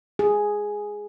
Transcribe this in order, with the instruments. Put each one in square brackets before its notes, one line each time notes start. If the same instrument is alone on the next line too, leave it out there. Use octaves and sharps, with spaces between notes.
[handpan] G#4